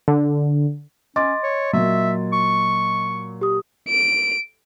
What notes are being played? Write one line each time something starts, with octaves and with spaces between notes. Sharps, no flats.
D3
C#4 D#5 C6 D6 A6
C#5
A#2 F#3 E5
C#6
G4 D#6
D7